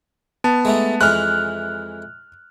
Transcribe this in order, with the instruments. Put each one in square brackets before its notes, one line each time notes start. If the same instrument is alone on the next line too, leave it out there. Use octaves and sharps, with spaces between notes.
[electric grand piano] B3 A5
[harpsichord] G#3 A3 D#4
[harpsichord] F2 E3 G#3 [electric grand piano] F6 F#6